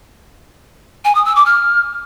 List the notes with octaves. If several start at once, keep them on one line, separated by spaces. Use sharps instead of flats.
G#5
D#6
E6
D6
F6